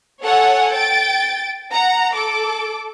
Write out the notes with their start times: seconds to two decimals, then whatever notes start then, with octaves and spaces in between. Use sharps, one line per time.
0.22 A4 C#5 F#5 G#5
0.74 G5 A6 D7
1.73 F#5 A#5
2.15 A4 D6